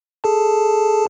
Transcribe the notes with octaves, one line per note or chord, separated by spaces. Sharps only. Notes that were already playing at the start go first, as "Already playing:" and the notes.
G#4 A4 A5